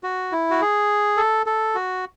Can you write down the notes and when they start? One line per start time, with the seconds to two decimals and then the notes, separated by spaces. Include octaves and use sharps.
0.03 F#4
0.32 E4
0.51 F#4
0.62 G#4
1.17 A4
1.46 A4
1.75 F#4